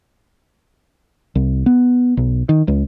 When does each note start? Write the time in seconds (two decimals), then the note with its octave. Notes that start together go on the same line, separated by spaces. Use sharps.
1.35 C2
1.66 B3
2.17 B1
2.49 D#3
2.68 C#2